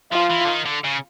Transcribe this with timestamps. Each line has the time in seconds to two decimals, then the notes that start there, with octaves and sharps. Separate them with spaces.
0.12 F3 F4
0.30 E3
0.45 D3
0.49 D#3
0.66 D3
0.84 C#3